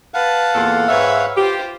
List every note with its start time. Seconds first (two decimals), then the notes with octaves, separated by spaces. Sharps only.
0.14 B4 F5 F#5 A5
0.54 E2 A#2 A4
0.88 G#2 B4 C#5 E5
1.36 F4 G4 C5